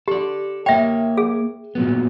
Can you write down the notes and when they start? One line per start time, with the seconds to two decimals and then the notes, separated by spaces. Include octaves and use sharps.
0.08 G4 A4 D5
0.66 A#3 C#5 E5 G5
1.17 G#4
1.75 A#2 F#3 B3